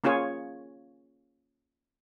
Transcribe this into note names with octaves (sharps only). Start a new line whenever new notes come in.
A#3 C#4 F4 G#4 C#5